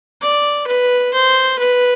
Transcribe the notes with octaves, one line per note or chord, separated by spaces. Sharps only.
D5
B4
C5
B4